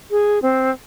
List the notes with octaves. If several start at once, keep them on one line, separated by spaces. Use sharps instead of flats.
G#4
C4